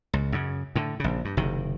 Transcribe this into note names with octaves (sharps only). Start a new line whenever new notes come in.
C#2
F#2 C#3
A2 D3
A#1 C#3
G2
F#1 C3 D#3